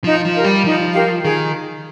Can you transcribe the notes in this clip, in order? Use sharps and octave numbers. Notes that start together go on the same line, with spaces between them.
F3 D#4
F3
G4 A#4 F5
G3
F3 D#4
G4 A#4 F5
D#3 G#4